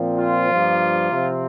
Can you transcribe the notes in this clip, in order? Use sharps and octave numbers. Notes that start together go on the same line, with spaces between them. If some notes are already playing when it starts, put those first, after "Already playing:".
Already playing: A#2 F3 C4
F4
G2 F3 A#3
C3 F3 C4